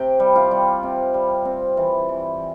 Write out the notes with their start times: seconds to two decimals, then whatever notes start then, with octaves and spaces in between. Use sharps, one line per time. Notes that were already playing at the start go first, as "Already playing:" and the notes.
Already playing: C3 G4 G5
0.20 G3
0.36 F4 F5
0.51 G3
0.83 C3
1.14 G3
1.45 C4
1.77 E3
2.09 E3